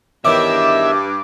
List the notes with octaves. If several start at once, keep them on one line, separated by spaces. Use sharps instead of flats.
E2 G2 D#3 C#5 E5 D6